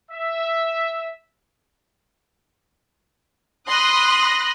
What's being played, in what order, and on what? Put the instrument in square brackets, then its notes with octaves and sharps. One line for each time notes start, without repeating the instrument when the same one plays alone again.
[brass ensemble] E5
[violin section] B5 C6 D#6 F#6 A#6